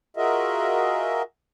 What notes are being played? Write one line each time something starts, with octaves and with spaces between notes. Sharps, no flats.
F4 F#4 G#4 A#4 D#5 E5